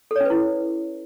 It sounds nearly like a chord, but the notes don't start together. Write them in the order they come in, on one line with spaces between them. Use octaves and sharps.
A4 C#5 C#4 B4 E4